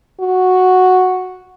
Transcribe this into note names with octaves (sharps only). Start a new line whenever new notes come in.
F#4